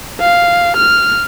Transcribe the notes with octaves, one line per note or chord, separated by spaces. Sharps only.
F5
F6